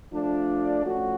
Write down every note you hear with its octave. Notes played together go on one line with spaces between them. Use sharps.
F3 A3 D4
F3 A3 C#4 F#4